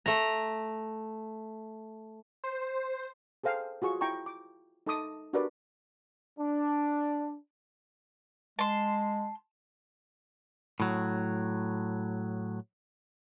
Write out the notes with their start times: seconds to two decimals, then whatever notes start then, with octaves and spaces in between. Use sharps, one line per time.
0.06 A3 A#5
2.44 C5
3.44 G#4 A4 C5 F5 G5
3.82 F4 F#4 G#4 C#6
4.01 E4 G5 A#5 C#6
4.26 D6
4.87 D#4 A4 A5 C6 D6 D#6
5.33 D4 F#4 G4 A#4 B4 D5
6.39 D4
8.59 G#3 A5 C6
10.80 A2 F#3